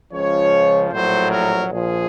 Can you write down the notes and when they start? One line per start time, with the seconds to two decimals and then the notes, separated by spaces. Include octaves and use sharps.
0.12 C#2 C#3 F3 C#5
0.91 A#1 A2 F#3 C5
1.31 A#4
1.70 A#1 A#2 F3 G#4